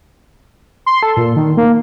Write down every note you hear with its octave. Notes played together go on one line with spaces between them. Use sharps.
C6
A4
A#2
D#3
A#3